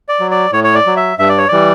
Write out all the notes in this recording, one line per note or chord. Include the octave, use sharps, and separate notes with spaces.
D5
F#3
D5
A2 C#5
C#5
D5
F#3
E5
G2 E5
D5
C#5
E3 G3 D5